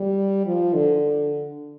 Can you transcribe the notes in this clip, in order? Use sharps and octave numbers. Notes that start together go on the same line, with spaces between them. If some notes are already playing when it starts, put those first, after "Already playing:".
Already playing: G3
F3
D3